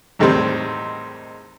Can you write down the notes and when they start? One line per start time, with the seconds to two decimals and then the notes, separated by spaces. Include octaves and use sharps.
0.19 E2 A2 D#3 G3 G#3 C4